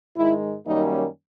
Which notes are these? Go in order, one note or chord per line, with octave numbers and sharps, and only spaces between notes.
G#2 D#3 G#3 E4
F#2 D#3 G3 A#3 C#4 D#4